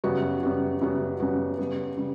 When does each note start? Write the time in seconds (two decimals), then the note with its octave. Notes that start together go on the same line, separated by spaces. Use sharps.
0.04 F#2 C#3 G3 B3 F#4
0.43 F#2 C#3 G3 B3 F#4
0.81 F#2 C#3 G3 B3 F#4
1.20 F#2 C#3 G3 B3 F#4
1.58 C#3 G3 B3
1.97 C#3 G3